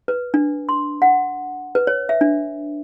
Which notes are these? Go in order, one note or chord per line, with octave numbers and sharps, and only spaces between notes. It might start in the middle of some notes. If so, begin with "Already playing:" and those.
B4
D4
C6
F#5
B4
C#5
E5
D4